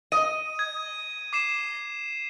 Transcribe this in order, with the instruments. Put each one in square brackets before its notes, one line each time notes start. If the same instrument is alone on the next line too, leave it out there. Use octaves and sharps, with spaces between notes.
[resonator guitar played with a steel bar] D#5 [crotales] D#7
[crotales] G#6
D6 C7 E7